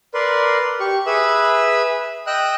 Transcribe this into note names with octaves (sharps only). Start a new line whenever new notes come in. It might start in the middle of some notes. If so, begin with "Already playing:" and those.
A#4 B4 D5 C6
G4 C#6
G#4 B4 E5 B5 E6
D#5 G5 E6 F#6